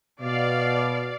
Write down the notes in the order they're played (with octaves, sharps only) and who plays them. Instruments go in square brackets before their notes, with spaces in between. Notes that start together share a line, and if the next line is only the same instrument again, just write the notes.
[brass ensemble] B2 [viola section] D5 F5